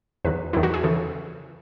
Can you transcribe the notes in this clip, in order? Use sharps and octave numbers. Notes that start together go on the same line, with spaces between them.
E2 D#3 F#3 B4
E2 D#3 F#3 E4
F#4
G#4
C#3 E3 A4